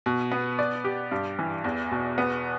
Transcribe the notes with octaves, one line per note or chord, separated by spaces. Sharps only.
B2
B3
D5
G4
G2
E3
E2
B2
B3